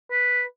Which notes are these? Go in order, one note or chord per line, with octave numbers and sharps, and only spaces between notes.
B4